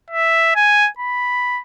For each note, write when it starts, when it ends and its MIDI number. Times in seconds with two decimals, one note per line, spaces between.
0.10 0.53 76
0.55 0.89 80
0.99 1.61 83